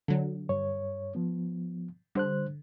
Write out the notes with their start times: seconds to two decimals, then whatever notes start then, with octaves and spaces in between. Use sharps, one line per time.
0.08 D3 F#3
0.49 G2 C#5
1.15 F3 B3
2.15 D3 G3 C5 F#6